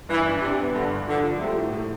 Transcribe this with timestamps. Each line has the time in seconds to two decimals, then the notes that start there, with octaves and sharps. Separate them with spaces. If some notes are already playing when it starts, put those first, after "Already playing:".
0.09 G2 E3
0.26 D4
0.41 C3 D4
0.58 B3
0.74 G2 D3
0.91 G2
1.07 D3 F3
1.23 F3
1.40 C3 A3
1.56 A2
1.73 A2